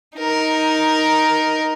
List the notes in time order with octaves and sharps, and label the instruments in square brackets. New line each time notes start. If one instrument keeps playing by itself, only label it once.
[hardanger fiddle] D#4 A#4